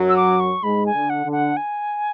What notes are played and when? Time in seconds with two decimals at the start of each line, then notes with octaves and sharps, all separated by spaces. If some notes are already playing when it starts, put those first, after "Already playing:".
Already playing: F#2 F#3
0.09 E6
0.16 D6
0.40 C#6
0.63 G#2 G#3 B5
0.86 G#5
0.94 D3
1.10 F#5
1.25 D3
1.32 F#5
1.57 G#5